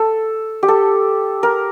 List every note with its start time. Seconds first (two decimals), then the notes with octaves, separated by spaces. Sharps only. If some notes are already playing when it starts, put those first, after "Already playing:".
Already playing: A4
0.63 G4
0.68 A4
1.43 A#4